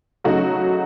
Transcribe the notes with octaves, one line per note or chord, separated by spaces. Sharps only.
C#3 F#3 A3 D#4 F#4